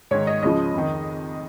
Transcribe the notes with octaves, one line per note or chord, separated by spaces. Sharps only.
G#2 D#3 C#5
D#5
C#2 C#3 F3 D#5
F2 D#3